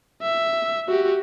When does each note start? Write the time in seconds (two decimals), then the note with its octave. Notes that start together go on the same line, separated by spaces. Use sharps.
0.22 E5
0.88 F#4 G4